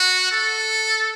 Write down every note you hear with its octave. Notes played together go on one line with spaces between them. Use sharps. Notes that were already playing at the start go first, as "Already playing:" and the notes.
Already playing: F#4
A4